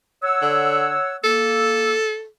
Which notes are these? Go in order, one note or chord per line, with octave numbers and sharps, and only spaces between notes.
C#5 F#5 E6
D3
A#3 A4 E6